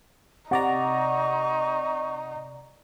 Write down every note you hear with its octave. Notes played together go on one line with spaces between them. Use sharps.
C3 D#4 D5 F#5 A#5 C#6